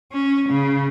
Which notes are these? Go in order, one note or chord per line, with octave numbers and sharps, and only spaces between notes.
C#4
C#3